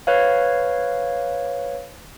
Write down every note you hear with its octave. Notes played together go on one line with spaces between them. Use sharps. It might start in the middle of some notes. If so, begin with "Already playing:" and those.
B4 C#5 F5